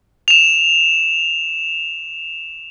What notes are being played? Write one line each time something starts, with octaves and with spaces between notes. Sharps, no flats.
E7 F7